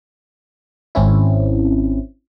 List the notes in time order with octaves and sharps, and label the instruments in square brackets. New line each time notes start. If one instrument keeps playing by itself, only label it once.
[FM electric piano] G#1 C4 C#4 E4